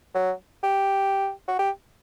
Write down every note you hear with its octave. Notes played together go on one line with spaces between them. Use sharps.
F#3
G4
F#4
G4